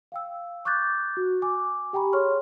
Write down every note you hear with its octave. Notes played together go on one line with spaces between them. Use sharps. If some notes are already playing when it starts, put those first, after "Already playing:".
F5 G5 E6
C#6 D6 F#6 G6 A6
F#4
G#5 D6
G4 G5 G#5 A#5 B5 C#6
G#4 C#5 C6 C#6 F6